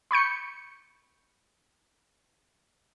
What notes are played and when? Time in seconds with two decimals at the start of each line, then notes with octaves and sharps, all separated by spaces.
0.11 B5 C#6 G6 C#7